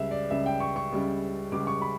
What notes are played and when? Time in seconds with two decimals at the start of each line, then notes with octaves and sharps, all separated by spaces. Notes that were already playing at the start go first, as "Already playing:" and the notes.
Already playing: C#2 C#3 G3 E5
0.11 D5
0.30 C#2 C#3 G3 E5
0.46 G5
0.60 C#6
0.76 C#6
0.92 C#2 C#3 G3
1.52 C#2 C#3 G3 D6
1.67 C#6
1.82 B5